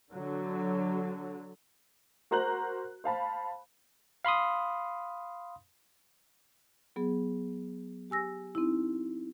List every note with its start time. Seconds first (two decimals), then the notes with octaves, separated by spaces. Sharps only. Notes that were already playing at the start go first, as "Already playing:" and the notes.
0.11 D3 F#3
2.31 F#4 A#4 C5 A#5 F#6 F#7
3.04 C5 F5 A5 B5
4.25 F5 B5 C6 D#6
6.96 F#3 B3 G#4
8.10 G4 G#5 E6 A#6
8.55 C4 D#4 E4